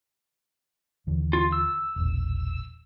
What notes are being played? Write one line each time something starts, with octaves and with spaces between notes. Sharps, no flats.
D#2 D3 E3
F4
E6
E1 A#1